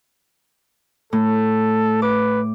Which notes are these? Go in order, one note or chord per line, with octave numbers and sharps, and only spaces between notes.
A2 A4
B4 D6